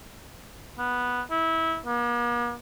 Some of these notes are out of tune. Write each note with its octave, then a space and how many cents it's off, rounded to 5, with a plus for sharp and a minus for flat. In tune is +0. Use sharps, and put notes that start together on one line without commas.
B3 -5
E4 -20
A#3 +45